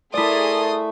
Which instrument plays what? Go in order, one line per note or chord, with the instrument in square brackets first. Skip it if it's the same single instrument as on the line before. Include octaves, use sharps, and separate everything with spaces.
[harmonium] A3 [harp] E4 D5 [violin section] G#4 A#4 A5 [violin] C6 D#6